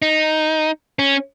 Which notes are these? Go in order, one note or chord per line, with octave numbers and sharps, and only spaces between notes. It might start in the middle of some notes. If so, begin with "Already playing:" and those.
D#4
C#4